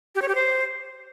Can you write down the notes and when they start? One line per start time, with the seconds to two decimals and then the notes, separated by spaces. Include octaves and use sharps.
0.15 G4
0.22 C#5
0.28 G4
0.35 C5